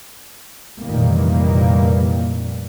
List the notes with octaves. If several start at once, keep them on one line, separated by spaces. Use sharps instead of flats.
F1 A#2 D#3 E3 G3 A#3